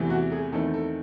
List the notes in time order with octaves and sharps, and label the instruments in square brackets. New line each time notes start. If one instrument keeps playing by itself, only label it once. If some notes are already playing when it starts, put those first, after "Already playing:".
Already playing: [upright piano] E2 C3 E3 A3 C4
F#4
G#4
E2 D#3 A3 C4 A4
A4